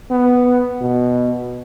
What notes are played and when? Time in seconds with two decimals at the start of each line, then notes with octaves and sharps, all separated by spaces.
0.10 B3
0.81 B2